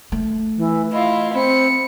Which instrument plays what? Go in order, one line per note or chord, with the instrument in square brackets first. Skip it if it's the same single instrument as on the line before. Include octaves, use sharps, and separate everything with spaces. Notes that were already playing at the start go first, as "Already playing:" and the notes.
[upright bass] A3
[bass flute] E3
[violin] E4 F4 [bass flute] D#5
[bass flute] C4 [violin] B5 C#7